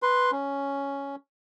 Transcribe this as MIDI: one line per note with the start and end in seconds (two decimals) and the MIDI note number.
0.03 0.31 71
0.03 0.31 84
0.32 1.16 61